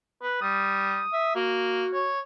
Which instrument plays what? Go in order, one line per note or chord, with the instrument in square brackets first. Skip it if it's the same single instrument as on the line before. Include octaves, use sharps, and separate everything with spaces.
[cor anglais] B4
[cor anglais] G3 [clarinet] D#6
[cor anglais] E5
[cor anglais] A#3 [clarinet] F#4
[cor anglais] C#5